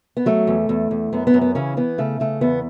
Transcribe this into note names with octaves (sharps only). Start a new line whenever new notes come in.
B3
F#3 A3
E2
E2
E2
F#2 B3
B3
F#2
B3
C#3 E3 C#4
E3 B3
C#3 A3
C#3 A3
E2 B3